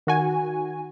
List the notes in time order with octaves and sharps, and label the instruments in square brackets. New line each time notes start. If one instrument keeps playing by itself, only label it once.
[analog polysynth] D#3 F#4 G#5